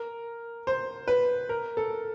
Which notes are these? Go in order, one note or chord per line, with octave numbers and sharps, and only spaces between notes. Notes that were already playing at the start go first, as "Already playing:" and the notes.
Already playing: A#4
C5
B4
A#4
A4